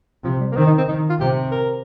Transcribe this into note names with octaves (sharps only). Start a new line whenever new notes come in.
C3 F3
G3
A#3
D#3 C4
D#4
C4
D#3 D#4
F4
C3 G4
A#4